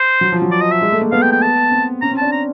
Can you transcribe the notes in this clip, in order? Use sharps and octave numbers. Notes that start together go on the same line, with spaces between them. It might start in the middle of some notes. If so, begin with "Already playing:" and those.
Already playing: C5
F#3
F3
F#3
D5
D#5
E5
G#3
A3
A#3
B3 F5
G5
G5
A5
C4
C#4 A#5
C4
D4 A5
A#5